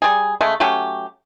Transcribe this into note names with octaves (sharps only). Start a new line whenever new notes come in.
G3 G#4
C#3 G#3 A3
F#3 A3 C#4 G4